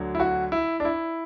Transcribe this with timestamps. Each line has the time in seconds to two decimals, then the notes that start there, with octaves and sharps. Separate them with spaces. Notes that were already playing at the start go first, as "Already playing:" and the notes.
Already playing: D2 D3 F#3
0.15 E4
0.20 F#4
0.52 E4
0.80 D4
0.85 E4